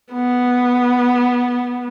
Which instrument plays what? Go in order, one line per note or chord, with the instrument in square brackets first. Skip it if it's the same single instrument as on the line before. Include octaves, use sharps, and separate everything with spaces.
[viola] B3